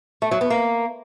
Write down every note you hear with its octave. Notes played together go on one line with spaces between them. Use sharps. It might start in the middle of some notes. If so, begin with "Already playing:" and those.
A3
F#3
B3
A#3